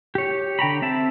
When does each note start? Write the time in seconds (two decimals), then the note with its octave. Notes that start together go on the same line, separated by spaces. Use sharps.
0.15 G4 C#5
0.59 D3 G5 A#5 B5
0.82 C4 E5 A5